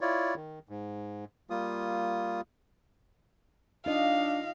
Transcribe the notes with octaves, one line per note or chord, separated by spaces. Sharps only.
E4 F4 C#5 D5
D#3
G#2
G3 A#3 F4 D#6
D4 D#4 F4 D#5 F5